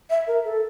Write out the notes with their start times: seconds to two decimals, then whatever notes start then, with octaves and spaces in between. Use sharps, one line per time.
0.10 E5
0.27 A#4
0.45 A4